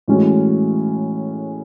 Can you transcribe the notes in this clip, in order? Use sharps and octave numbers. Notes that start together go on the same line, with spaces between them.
A2 E3 G#3 C#4 F#4